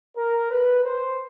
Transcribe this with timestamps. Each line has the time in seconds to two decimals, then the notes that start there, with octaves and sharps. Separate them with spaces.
0.16 A#4
0.50 B4
0.84 C5